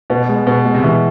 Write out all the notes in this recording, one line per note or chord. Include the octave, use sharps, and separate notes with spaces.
B2 B3
G#3
B2 B3
G#3
C3
B2 E3